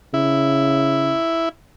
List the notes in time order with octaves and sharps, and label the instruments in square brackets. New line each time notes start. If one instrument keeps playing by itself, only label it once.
[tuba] C#3 [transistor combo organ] E4